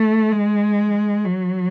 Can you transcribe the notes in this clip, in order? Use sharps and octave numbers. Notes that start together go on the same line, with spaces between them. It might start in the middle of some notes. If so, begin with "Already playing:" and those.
Already playing: A3
G#3
F#3